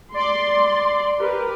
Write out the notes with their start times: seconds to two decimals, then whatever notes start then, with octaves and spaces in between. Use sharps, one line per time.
0.14 D5 C6
1.19 G4 A#4 B4